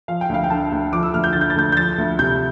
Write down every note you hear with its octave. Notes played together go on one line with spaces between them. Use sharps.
F3 F5
G5
D2 F5
G5
D3 A5
D2
F3 D6
E6
D2 F6
G6
D3 A6
G6
A6
D2 G6
G6
F3 A6
D2
C3 G6